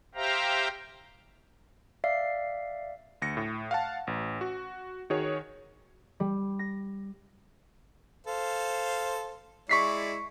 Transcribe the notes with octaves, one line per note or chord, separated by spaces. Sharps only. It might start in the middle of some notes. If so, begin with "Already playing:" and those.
G4 C5 E5 F5 G5 A#5
D5 E5 F5 C7
D2 A#6 C#7
A2
F5 F#5 A5
A1
F#4
D#3 F#4 G#4 C#5
G3
A#6
A4 C5 F5
G#3 E4 D5 C#6 B6 C7